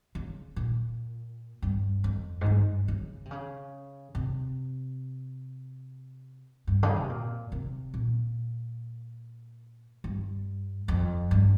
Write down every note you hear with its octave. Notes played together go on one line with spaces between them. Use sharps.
C#3
A#2
G2
F2
G#2
G2
C#3
C3
C#3
C3
G2
C#3
C3
A#2
C3
A#2
G2
F2
G2